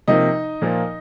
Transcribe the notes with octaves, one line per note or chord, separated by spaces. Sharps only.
C3 F3 A#3 D#4 D#5
A#2 F3 A#3